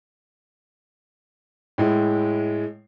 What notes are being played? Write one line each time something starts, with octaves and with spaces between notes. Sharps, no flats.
A2 G#3 E4